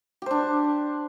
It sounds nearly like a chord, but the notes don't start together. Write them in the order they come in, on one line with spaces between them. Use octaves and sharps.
G4 C5 D4